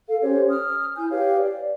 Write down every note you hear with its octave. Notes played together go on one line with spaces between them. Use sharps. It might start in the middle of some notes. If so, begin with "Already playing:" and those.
A4 F5
C#4 G4 C5 C#5
D#6 F6
E4 G#5 G6
G4 B4 C#5 F5
D5